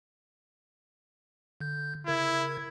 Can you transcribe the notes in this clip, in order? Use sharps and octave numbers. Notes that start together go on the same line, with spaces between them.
D3 G6
C#3 E4 A#4 G#6